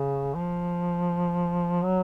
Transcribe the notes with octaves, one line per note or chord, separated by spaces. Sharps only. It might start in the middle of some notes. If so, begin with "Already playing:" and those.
Already playing: C#3
F3
F#3